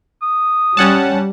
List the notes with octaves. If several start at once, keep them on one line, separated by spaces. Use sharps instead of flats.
D#6
G3 C#4 F#5 A5